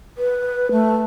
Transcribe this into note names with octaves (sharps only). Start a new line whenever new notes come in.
B4
A3